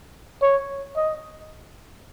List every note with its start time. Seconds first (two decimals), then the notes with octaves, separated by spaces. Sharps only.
0.42 C#5
0.97 D#5